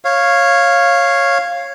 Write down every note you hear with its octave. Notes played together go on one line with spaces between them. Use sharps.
C#5 F5